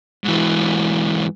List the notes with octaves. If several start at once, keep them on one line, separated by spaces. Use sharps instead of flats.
G#2 E3